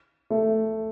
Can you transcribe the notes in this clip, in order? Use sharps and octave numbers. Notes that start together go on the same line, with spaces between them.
A3